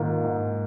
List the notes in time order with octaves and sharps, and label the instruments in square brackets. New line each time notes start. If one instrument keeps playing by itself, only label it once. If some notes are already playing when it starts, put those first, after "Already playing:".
Already playing: [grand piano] G#2 D#3 A#3 F4
G#2